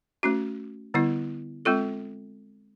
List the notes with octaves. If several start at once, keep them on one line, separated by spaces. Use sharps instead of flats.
A3 C#4 F#4
D3 G3 B3 E4
G#3 C4 F4 A4